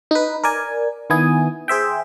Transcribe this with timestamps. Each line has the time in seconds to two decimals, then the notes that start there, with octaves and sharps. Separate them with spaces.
0.11 D#4 B4
0.44 A#4 D5 G#5
1.10 D#3 B3 E4 G#5 D#6
1.68 G#4 C5 E5 G5